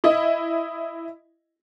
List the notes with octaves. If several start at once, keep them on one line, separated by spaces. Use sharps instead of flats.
E4 D#5